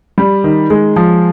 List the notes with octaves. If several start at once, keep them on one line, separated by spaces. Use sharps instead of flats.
G3
D#3
G#3
F3